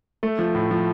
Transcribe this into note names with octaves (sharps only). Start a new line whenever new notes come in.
A3
F3
A2
F3